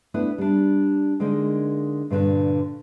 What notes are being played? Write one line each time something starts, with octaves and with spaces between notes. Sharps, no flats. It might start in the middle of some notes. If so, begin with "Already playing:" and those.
A3 B3 D4 E4 B4
G3 D4
D3 G#3 A#3 D#4
G2 A#2 D3 D4